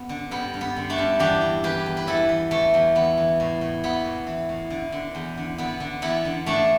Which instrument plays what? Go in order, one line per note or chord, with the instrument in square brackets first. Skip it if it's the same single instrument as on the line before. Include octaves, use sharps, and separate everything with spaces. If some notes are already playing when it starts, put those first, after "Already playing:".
Already playing: [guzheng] B3
D3
G2 B3
G2
B3
D3
A3 D4
G2
E2 D4 G4
E3
E2 G4 B4
E2
B4
E2 E4 A4
E3
E3 A3
E2
E3 B3
E3
A2
A2
E3 B3
A2
E3
A2
D3
D3
E2
D3
D3 B3
D3
E2 B3 E4
D3
A2 A3 D4